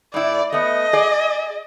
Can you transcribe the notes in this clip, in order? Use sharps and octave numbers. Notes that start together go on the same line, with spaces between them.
A2 E4 D5
A3 B3 D#5
G#4 D5